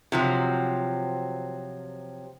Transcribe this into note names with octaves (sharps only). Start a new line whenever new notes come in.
C3 F3 F#3